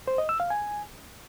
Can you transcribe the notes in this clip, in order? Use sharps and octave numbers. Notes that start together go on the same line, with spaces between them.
C5
D#5
E6
F5
G#5